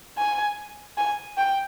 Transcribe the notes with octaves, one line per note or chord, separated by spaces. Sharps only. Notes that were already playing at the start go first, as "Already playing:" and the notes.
G#5
G#5
G5